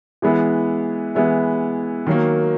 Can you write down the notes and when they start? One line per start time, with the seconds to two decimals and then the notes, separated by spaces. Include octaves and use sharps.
0.22 E3 G#3 B3 E4
1.15 E3 G#3 B3 E4
2.07 D#3 F#3 A#3